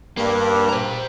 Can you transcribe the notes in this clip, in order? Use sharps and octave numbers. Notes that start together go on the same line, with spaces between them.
G2 A#3
C5 A#5